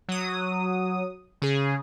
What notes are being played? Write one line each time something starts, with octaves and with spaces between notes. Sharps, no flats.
F#3 D#6
C#3 G#4